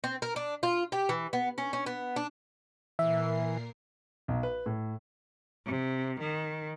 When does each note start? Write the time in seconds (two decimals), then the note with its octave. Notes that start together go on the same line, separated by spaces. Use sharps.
0.04 C4
0.22 A#4
0.36 D4
0.63 F4
0.92 G4
1.09 E3
1.33 B3
1.58 C#4
1.73 C#4
1.86 B3
2.16 D4
2.99 A#2 E3 A#4 E5 C7
4.28 B1
4.43 B4
4.66 A2
5.66 C3
6.20 D#3